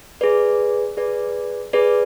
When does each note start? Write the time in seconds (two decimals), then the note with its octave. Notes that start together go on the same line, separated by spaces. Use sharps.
0.21 G#4 B4 D5
0.97 G#4 B4 D5
1.73 G#4 B4 D5